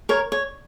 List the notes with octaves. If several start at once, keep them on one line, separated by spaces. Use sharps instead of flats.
A#4 C#5
C#5